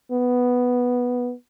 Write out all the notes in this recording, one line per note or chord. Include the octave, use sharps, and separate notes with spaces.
B3